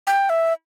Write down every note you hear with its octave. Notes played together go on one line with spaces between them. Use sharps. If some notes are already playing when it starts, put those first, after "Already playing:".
G5
E5